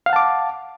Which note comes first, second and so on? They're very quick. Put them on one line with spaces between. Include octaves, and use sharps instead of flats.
F5 F#5 A5 D6